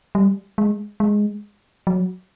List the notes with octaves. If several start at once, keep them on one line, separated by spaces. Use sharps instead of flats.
G3
G#3
G#3
F#3